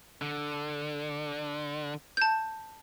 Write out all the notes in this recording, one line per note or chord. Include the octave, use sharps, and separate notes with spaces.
D3
A5 G6